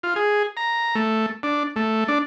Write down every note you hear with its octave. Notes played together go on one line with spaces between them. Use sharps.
F4
G#4
A#5
A3
D4
A3
D4